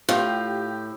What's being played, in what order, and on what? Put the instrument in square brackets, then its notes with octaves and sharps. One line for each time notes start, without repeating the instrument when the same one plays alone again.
[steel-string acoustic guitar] A2 [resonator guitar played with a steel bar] F4 [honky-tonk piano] G4